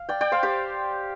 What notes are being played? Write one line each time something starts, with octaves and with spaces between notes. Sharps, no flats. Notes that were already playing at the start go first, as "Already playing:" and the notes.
Already playing: F5
D5 G5
D5 G5
C5 F5
G4 C5